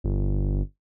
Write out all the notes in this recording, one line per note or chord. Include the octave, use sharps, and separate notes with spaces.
G1